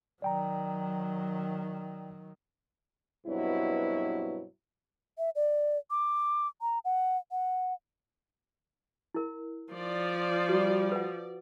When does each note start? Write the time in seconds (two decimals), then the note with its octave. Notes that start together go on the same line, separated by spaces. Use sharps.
0.22 D#3 F#3 D5 G5 A#5
3.26 G2 B2 F#3 C4 E4
5.18 E5
5.36 D5
5.91 D6
6.62 A#5
6.85 F#5
7.31 F#5
9.14 E4 A#4
9.73 F3 D5
10.49 G3 F#4
10.92 B4 F#5